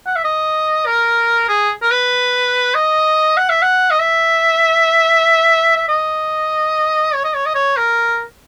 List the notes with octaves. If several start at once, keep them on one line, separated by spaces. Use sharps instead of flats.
F#5
E5
D#5
A#4
G#4
A#4
B4
D#5
F#5
E5
F#5
D#5
E5
E5
D#5
C#5
D#5
C#5
D#5
C#5
A#4